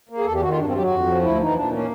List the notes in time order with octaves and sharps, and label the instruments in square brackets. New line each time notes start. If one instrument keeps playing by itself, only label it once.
[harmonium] A#3
G#4
E2 A4
G4
D#3 F#4
F4
G2 D4
C4
F#3 G4
F#4
F2
F3
D2 E4
E3 D#4
A#2 D4
A#3 C#4